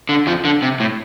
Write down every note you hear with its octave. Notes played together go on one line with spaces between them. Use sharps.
D3
F2 F3
D3
C3
A2